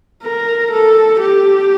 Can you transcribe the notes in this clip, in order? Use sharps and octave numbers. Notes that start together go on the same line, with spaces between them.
A#4
A4
G4